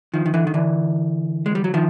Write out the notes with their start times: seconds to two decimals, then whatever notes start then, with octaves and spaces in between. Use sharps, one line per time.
0.14 D#3 F3
0.26 D#3
0.34 D3 E3
0.47 D#3
0.54 D3 E3
1.46 G#3
1.55 G3
1.64 F#3
1.74 D#3 F3